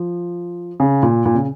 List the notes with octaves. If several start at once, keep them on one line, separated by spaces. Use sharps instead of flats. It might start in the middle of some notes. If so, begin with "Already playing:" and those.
Already playing: F3
C#3
A#2
A#2
C#3